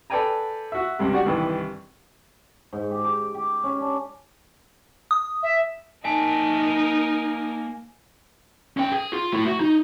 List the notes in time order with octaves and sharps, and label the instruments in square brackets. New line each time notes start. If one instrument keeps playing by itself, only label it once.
[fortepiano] A4 B4 D5 G5 G#5 A#5
F#4 E5
C#2 G2 C3
F#4 G4 D5 F#5
C2 G2 D#3 E3
[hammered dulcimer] G#2
G4
D6
G4
C#4
D4
[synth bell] D#6
[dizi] E5
[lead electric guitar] A#3 A5 [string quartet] D#4 A#4 [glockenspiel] G#5
[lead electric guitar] C#4 G5
G#4
F4
A3 E4
F#4
D#4